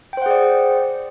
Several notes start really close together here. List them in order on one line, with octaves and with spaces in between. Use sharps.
G5 C5 F#5 G#4 D5